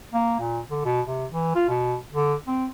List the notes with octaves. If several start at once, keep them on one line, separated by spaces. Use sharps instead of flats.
A#3
A#2
D3
B2
C3
E3
F4
B2
D3
C4